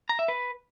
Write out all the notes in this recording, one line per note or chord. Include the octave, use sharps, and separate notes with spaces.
A#5
E5
B4